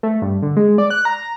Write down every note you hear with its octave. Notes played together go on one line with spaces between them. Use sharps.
A3
G2
D3
G#3
D5
F#6
A#5